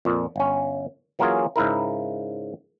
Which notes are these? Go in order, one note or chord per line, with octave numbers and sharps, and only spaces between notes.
F2 A#2
G1 C#4
E3 F#3 A#3 C#4 F4 G#4
G#2 C#3 E4 A#4